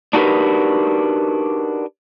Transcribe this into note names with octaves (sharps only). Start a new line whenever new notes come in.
D4 D#4 F#4 G4 A#4 B4